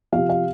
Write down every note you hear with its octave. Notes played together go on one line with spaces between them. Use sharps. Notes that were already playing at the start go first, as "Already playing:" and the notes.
C3 F3 F5
F5